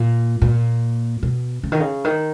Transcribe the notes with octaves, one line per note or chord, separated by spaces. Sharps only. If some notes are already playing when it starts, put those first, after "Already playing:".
Already playing: A#2
A#2
B2
C#3
D#3
C#3
D#3